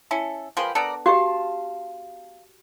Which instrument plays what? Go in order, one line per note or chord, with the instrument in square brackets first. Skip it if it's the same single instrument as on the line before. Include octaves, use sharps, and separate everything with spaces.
[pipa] C#4 E4 A4
[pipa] F3 G#3 C6 [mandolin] G4 A#4 B4
[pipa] B3 D4 A4 [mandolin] A#4 D5 A#5
[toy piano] F#4 G4 [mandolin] F5 A5 C6